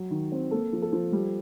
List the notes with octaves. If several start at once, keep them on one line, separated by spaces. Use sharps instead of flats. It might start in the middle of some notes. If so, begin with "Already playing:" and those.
Already playing: F#3
D#3
C4
A#3 A4
F3
A4
F3
G3